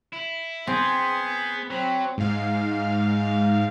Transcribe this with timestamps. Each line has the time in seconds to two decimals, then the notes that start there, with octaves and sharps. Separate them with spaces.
0.13 E4
0.67 B3 C4 G#4 C5
1.71 F#3 C4 B5
2.18 G#2 F5